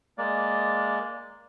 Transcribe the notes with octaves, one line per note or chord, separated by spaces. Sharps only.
G#3 A#3 D5